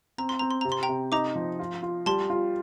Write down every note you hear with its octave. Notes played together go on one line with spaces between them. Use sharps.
C4 A#5
C6
C4 A#5
C6
C3 A#5
C6
G5 A#5
C3
D#4 A#5 D6
F3
F4
F4
G3 A5 C6
F4